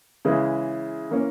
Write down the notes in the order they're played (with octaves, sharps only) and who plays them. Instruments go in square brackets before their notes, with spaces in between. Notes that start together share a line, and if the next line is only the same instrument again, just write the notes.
[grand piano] C#3 E3 G#3 E4
E3 A#3 C#4